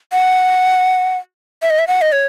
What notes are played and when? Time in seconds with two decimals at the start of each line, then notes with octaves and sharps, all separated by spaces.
0.12 F#5
1.62 E5
1.70 D#5
1.79 E5
1.88 F#5
2.02 D#5
2.12 C#5